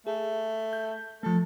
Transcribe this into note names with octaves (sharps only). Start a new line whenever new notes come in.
A3 G#4
G6
F3 A3 A4